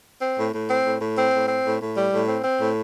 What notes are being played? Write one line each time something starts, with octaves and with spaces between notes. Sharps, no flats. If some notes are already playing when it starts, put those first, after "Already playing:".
C4
A2
A2
C4
A2
A2
C4
A2
C4
A2
A2
G3
A2
C4
C4
A2